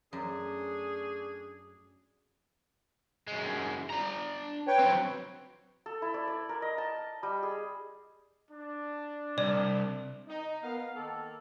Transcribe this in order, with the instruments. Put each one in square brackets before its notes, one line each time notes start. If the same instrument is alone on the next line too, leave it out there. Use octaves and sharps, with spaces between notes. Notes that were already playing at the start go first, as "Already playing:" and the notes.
[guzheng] F#2 [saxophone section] A3 D4 G#4
[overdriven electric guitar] F#2 G#3
D4 A#5
[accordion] B4 C#5 G5
[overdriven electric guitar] F#3 C4
[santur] A4
E4
D5
D5
A#4
D#5
A5
G3
G#4
[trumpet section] D4
[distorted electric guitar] C2 [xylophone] D5
[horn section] D#4
[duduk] B3 [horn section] A#4 F5
[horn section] D#3 A#3 [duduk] A4